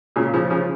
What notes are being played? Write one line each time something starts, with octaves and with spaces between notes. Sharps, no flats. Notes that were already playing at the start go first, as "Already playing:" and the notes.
A#2 C#3
C#3 F3
C#3 F3